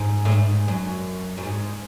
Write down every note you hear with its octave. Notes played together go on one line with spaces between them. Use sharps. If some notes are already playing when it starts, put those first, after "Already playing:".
Already playing: G#2
A2
G#2
F#2
F#2
G#2